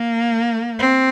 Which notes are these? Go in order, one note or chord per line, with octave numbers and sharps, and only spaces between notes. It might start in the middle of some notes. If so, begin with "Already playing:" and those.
Already playing: A#3
C4